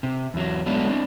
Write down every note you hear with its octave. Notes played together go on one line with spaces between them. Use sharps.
C3
E2 F#3
F#3 G#3 A3 B3 D4
C4 D4